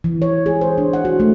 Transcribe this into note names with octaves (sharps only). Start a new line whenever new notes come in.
E3
C#5
G#4
C5
D4
F#5
F#4
A3